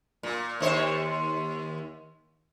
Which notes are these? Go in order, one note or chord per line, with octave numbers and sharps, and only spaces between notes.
A#2
D#2 C5 C#5